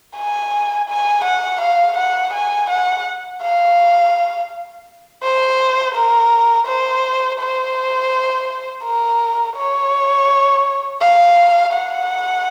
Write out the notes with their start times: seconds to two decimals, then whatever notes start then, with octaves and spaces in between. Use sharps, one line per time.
0.17 G#5
0.89 G#5
1.24 F#5
1.61 F5
1.97 F#5
2.33 G#5
2.70 F#5
3.42 F5
5.23 C5
5.95 A#4
6.67 C5
7.40 C5
8.84 A#4
9.56 C#5
11.01 F5
11.73 F#5